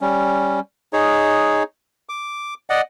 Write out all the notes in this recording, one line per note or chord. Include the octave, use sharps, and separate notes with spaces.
G3 C#4
D#4 G#4 C#5
D6
D5 D#5 F#5